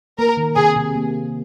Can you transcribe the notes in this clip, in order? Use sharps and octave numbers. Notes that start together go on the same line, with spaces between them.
A#3 A#4
D#3
C3 G#4
C3
A#3